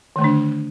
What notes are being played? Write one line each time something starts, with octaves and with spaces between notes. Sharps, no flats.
D3 D#3 A3 D4